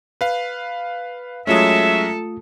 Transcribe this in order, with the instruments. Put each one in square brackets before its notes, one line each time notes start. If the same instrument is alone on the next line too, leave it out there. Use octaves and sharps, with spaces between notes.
[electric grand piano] B4 F5
[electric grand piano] F#3 G#3 C#4 [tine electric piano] A3 F4 D#6 [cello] A4 [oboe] E5